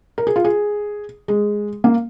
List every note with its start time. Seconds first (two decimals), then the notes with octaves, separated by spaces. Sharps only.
0.18 A#4
0.27 G#4
0.36 F4
0.45 G#4
1.28 G#3
1.84 A#3